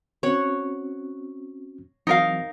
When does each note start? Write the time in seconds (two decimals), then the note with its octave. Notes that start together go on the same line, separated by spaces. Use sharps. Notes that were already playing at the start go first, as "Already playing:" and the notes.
0.23 C4 C#4 F#4 C#5 F#5
2.07 E3 F#3 C4 D#4 A#4 F5